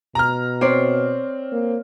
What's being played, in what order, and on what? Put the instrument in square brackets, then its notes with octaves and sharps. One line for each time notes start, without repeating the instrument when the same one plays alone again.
[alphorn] B2 [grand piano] A#5 F6
[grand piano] C4 [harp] C#5 D5 C6
[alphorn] A#3